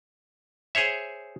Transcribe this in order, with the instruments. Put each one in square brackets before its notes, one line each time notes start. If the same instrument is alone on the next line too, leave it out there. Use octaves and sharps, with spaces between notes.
[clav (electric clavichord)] G#4 C5 C#5 E5